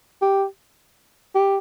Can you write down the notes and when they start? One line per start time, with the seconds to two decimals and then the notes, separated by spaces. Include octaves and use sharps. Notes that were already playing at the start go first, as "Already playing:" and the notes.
0.22 G4
1.35 G4